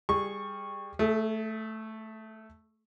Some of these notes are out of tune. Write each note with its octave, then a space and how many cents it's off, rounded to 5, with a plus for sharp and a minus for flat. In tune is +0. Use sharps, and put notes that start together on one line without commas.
G3 +20 G#4 +5 C#6 -10
A3 +0 G#4 +45